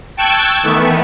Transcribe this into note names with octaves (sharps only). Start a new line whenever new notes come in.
G5 A5 C#6 E6 F#6 G#6
D#3 E3 A3 B3